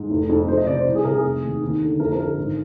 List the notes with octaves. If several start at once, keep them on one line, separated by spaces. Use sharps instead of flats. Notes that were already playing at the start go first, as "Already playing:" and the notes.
Already playing: G#2
F1
F2
F2 C5
D#5
C3 D5
C5
C2
G#4
C3 A#4
G#4
F1
D#2
D#2
D3
F2 A#4
A#4
D3
A#4
G#1